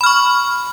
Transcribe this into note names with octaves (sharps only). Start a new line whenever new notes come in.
B5 C#6 F6